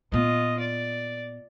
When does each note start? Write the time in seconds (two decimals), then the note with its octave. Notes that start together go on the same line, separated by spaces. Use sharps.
0.12 A#2 B3 F4 D#5
0.60 D5